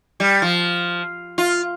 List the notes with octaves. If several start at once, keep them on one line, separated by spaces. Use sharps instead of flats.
G3
F3
F4